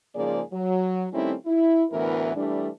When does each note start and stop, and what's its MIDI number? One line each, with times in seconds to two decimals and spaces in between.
0.15 0.41 44
0.15 0.41 49
0.15 0.41 53
0.15 0.41 58
0.15 0.41 68
0.15 0.41 74
0.52 1.06 54
1.12 1.34 51
1.12 1.34 55
1.12 1.34 57
1.12 1.34 60
1.12 1.34 61
1.12 1.34 64
1.46 1.83 64
1.91 2.33 38
1.91 2.33 45
1.91 2.33 52
1.91 2.33 59
1.91 2.33 64
1.91 2.33 70
2.35 2.68 52
2.35 2.68 55
2.35 2.68 57
2.35 2.68 62